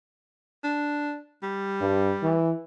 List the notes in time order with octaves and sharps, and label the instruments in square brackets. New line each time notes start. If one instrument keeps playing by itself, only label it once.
[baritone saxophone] D4
G3
[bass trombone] G2
E3